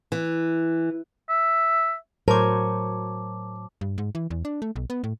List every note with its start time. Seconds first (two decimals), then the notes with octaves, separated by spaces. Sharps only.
0.12 E3
1.29 E5
2.28 A2 F#3 A#4 C5 C#5 A5 D6
3.81 G2
3.98 G#2
4.15 E3
4.30 E2
4.45 D4
4.62 A3
4.76 B1
4.90 B3
5.04 A2